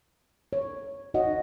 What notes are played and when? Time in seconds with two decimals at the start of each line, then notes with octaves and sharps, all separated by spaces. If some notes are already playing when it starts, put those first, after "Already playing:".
0.53 C#5
1.14 D#4 F#4 C#5 D#5 F#5